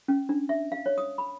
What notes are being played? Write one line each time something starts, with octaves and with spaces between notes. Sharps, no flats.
C#4
D4
E5
F5
C#5
D#6
B5